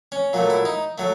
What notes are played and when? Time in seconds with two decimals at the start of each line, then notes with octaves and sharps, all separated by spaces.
0.12 C#4
0.33 A#2 F#3 A3
0.50 E4
0.65 D#4
0.98 F#3 A3